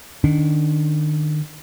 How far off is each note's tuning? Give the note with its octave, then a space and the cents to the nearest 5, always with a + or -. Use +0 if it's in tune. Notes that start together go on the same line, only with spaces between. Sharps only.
D#3 -35 D4 -35